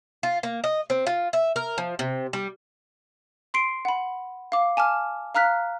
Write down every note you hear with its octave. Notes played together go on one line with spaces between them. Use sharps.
F4
A#3
D#5
C4
F4
E5
A#4
F3
C3
G3
C6 C7 D7
F#5 B5
F5 D6
G#5 A5 D6 F6
F5 A#5 F6 F#6 B6